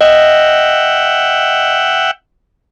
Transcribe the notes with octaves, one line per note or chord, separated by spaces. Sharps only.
D#5 E5 F#5 G5